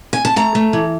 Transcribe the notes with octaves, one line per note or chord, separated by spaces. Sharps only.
G#5
A5
A3 A#5
A3
E3